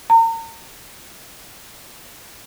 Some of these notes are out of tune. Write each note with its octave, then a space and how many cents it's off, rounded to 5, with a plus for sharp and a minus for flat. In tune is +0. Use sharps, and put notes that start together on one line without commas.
A#5 -40